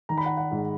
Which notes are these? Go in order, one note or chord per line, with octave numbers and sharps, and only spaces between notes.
D#3 A#5
B5
F#5 A#5
F#5
G#2